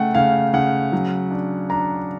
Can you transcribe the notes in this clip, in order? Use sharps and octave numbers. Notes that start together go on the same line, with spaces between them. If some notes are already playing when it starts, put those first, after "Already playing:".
Already playing: C#3 A3 F#5 G5
C#3 F5
C#3 F#5
F#3
D4
D4 A#5